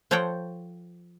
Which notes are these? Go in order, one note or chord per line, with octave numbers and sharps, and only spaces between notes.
F3 A4 C5 C#5 F#5 G5